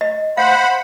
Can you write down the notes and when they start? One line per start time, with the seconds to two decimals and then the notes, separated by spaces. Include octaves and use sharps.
0.01 D#5
0.37 C5 F5 F#5 B5